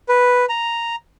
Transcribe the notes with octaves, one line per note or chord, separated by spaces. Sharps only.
B4
A#5